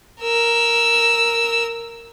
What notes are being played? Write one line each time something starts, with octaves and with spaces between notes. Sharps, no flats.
A#4 E6